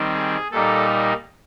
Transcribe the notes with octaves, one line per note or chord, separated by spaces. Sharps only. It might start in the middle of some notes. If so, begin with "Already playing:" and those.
Already playing: D#3 G3 C4
G#4
A#2 G3 A#3 D#4 A4